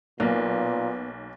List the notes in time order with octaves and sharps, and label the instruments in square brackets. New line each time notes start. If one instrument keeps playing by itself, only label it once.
[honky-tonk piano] B1 [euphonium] A#2 [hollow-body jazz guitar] A#3 [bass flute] B3